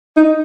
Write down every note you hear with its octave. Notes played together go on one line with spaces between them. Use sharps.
D#4